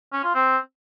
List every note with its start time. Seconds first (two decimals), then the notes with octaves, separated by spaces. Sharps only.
0.13 C#4
0.23 F4
0.34 C4